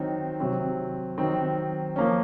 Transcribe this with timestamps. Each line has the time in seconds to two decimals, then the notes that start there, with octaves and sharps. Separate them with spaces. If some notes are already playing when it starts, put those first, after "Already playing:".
Already playing: D#3 F#3 C4 D#4
0.40 C3 F#3 C4
1.18 D#3 F#3 C4 D#4
1.96 F3 A#3 C#4